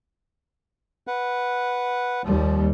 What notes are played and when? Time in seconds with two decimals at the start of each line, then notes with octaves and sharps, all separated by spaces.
1.07 B4 F#5
2.25 D#2 F3 G3